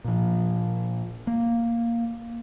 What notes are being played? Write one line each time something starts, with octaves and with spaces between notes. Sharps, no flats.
A#2 F3
A#3